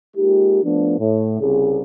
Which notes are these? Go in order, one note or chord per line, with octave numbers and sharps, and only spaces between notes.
G#3 A#3 D#4 F4 G4
F3 A3 B3 D4
A2
C2 C#3 G#4